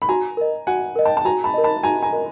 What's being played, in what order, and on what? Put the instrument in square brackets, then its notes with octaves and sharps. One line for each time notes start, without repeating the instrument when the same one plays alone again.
[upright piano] B5
[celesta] F#4 [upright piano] G#5 A#5
[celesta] A#4 D#5
[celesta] F#4 [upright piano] F#5 G#5
[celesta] A#4 D#5
[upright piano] G5 A5
A5
[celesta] F#4 [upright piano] G#5 A#5
[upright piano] A5 B5
[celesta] A#4 D#5
[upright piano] A5 B5
[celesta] F#4 [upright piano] G#5 A#5
[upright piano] G#5 A#5
[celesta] A#4 D#5